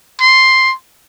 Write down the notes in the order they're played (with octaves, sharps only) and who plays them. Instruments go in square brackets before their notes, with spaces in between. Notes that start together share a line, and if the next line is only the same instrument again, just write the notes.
[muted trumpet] C6